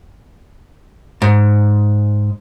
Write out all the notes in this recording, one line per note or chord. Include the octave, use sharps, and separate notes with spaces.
G#2